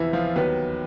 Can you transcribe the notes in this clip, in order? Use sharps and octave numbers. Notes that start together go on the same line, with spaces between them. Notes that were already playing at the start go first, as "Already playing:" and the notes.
Already playing: E2 C3 E3 F3 E4
F3 F4
D#2 D#3 F#3 B3 B4